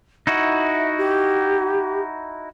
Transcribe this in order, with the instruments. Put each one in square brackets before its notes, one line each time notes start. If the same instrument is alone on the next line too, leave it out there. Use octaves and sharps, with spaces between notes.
[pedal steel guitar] D#4 E4 F#4 [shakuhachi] E5
[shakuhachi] G4